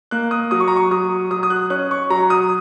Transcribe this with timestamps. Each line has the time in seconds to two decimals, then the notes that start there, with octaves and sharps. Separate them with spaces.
0.11 A#3 F#6
0.31 D#6
0.51 F#3 D#6
0.60 C#6
0.68 A#5
0.76 C#6
0.91 F#3 D#6
1.31 F#3 D#6
1.43 D#6
1.50 F#6
1.70 C#4 F#6
1.91 C#6
2.10 F#3 A#5
2.30 D#6